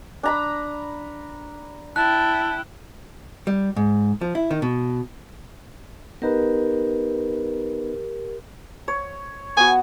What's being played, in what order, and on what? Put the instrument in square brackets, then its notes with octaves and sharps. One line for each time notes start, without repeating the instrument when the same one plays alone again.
[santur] D4 A#5 B5
[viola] E4 G5 [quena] A5 [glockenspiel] F#6
[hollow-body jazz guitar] G3
G#2
F3
E4
D#3
B2
[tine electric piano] B3 D#4 B4 [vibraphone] G4 A#4
[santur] C#5
[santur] B3 F#4 [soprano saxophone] G#5